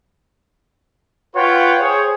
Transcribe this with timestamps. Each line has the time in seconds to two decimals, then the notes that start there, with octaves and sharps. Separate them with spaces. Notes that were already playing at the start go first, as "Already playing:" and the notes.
1.35 F4 B4 C#5 F#5 G5
1.80 G#4 C5 C#5